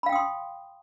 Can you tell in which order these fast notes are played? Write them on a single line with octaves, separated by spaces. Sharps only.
B5 F5 G5 D#6 C6